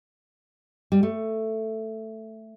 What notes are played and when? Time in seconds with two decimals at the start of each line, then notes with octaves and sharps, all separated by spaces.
0.92 G3
1.03 A3